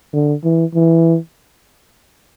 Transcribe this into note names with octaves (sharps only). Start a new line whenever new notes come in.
D3
E3
E3